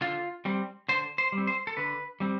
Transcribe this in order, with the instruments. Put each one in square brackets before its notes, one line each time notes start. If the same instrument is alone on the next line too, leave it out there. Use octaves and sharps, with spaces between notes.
[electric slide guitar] D3 F4
G3 C4
D3 C5
C5
G3
C4
C5
A4
D3 B4
G3 C4